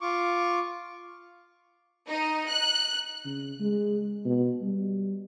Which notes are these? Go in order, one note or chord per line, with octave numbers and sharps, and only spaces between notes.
F4 C#6 D6
D#4
F#6
C#3
G#3
B2
G3